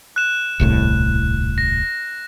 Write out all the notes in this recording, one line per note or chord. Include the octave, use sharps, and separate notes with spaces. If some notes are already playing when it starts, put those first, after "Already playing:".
F#6 E7
D#1 C2 A2
A#6